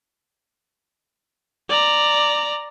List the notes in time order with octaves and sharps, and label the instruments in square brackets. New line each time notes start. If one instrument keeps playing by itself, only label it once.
[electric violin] D5 A#5